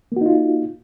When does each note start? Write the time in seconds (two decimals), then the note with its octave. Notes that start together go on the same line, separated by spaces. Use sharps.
0.12 A#3
0.16 F#4
0.21 D#4
0.26 F4